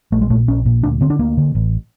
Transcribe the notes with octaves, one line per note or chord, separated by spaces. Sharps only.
A#1 A3
G#3
A#2 A3
A#1 C#4
A#2
D2 D4
D3 C4
D4
D2 A#3
D3
A1